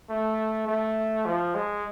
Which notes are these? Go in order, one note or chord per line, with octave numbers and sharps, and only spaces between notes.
A3
A3
F3
G#3